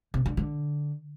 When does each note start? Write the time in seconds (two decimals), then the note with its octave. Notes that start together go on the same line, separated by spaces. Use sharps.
0.14 C3
0.26 D3
0.37 D3